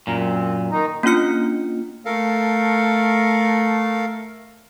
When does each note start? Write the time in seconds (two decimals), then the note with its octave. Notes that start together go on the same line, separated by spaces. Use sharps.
0.07 F#2 A#2 A#4
0.19 C4
0.70 D#3 D#4
1.03 A#3 C#4 D4 F4 F6 C#7
2.05 A3 A4 A#4 F5